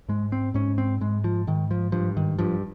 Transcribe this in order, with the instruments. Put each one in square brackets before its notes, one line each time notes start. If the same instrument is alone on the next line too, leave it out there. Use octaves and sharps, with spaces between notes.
[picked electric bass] G#2 G#3
C4
G#2 C#4
C4
G#2 G#3
F3
G#2 D#3
F3
G2 F3
D#3
G2 F3